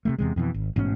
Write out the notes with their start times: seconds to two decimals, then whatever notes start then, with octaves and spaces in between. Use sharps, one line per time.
0.05 C3 G3 A3
0.18 E2 C3 G#3
0.36 F2 B2 E3
0.54 G#1
0.76 A1 G#2 B2 C#4